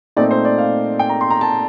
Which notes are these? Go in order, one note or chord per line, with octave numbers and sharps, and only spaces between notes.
A#2 A3 C4 D#4 D5
C5
D5
F5
G5
A#5
C6
A#5
A5